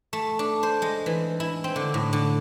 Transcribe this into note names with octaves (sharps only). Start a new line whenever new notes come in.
A3
D4
C5
G#3
E3
E4
C4
D3
A2
D3